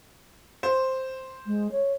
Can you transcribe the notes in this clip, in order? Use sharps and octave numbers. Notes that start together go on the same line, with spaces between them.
C5
G#3
C#5